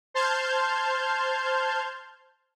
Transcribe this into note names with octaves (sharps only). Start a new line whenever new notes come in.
C5 A5 C6 F6 G6 G#6